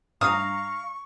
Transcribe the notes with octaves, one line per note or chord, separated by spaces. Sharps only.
G2 F5 A#5 C#6 D#6